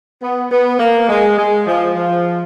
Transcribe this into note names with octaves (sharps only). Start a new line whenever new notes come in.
B3
B3
A#3
G#3
G#3
F3
F3